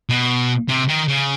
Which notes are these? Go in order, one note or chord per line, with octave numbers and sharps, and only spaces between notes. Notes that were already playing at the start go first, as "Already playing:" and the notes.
B2
C3
D#3
C#3